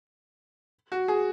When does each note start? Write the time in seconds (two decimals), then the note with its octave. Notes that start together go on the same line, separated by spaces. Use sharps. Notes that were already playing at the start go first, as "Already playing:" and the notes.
0.92 F#4
1.08 G#4